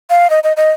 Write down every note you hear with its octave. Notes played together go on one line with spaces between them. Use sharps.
F5
D#5
D#5
D#5